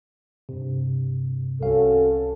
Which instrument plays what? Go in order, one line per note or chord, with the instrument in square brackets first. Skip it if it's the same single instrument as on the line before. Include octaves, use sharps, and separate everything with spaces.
[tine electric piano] G2 C3
[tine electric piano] C2 F5 [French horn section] C#4 F#4 A4